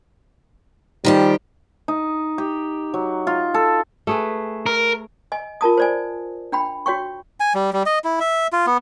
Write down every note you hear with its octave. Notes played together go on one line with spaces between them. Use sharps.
D#3 F3 G3 G4
D#4
G4
F#3
F4
A4
A3 G#4 B4
A#4
D#5 G#5
F4 A#4 A5 D#6
C5 D5 G#5
D4 G5 B5
F#4 C#5 G5 C#6
G#5
G3
G3
D#5
E4
E5
F4
B3